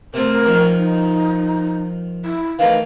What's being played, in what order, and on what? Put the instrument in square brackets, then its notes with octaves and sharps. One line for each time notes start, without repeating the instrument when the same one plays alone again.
[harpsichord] C3 A3 C4 [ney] A#4
[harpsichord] D#3 F3
[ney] D#4
E4
[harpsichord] D#3 E3 A3 [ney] F5